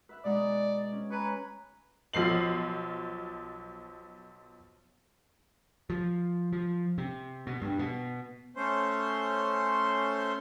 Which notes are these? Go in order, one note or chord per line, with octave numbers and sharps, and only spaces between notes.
B4 E5 F#6
B2 G#3 D#4 D5
C#4
B4 C#5 G#5 A#5
B1 F3 C7 F#7
F3
F3
C3
B2
G2
B2
A3 C#4 C5 C6